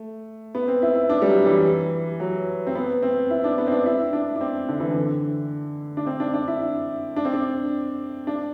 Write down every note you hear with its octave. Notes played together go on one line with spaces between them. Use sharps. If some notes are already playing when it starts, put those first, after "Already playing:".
Already playing: A3
B3
C4
E4
E4
D4
G3
F#3
E3
F#3
C4
B3
C4
E4
D4
B3
C4
D4
E4
D4
D4
C4
D3
E3
D3
D4
C4
D4
D4
E4
D4
C4
D4
D4